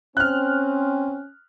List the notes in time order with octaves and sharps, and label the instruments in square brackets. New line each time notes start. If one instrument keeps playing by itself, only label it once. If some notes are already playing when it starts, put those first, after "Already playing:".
[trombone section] C4 [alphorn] C#4 [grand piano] F6 F#6